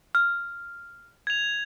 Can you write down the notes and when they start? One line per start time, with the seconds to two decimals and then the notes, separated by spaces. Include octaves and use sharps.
0.15 F6
1.27 G#6 F7